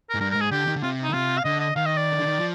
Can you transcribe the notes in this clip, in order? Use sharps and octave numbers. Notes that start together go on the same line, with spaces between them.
A#4
G#2
G2 A#4
A#4
G#2
G#4
D3 G4
D#3
D3
C3 F4
D#4
D3
C3 F4
F5
D3 D#5
D#5
D#3 F5
D#5
D5
D3
D#3
F3